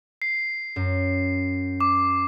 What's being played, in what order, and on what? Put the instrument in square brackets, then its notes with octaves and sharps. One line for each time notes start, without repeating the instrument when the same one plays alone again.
[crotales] C7
[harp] F#2
[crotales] D6